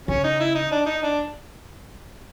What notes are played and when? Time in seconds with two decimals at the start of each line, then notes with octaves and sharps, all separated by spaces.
0.08 C#3 C#4
0.24 D#4
0.40 E4
0.55 D#4
0.71 D4
0.86 D#4
1.03 D4